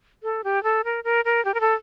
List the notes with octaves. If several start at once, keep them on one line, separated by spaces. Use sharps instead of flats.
A4
G4
A4
A#4
A#4
A#4
G4
A#4
A4